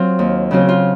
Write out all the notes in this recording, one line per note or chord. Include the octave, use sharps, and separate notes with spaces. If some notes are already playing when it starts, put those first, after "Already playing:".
Already playing: F#3 C4 F4
D#2
C#3 F#3 C4 F4
F4